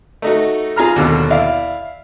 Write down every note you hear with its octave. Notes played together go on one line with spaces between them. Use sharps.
A3 D#4 F#4
F4 G#4 A#5 F6
D#2 B2 D3
E4 D5 F5